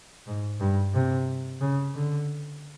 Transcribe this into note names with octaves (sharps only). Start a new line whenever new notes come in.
G#2
G2
C3
C#3
D3